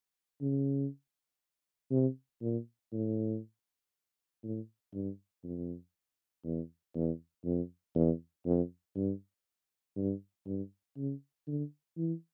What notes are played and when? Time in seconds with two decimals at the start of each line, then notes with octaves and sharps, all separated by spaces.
0.41 C#3
1.91 C3
2.42 A#2
2.92 A2
4.43 A2
4.94 G2
5.44 F2
6.45 E2
6.95 E2
7.45 F2
7.95 E2
8.46 F2
8.96 G2
9.97 G2
10.46 G2
10.97 C#3
11.47 D3
11.97 E3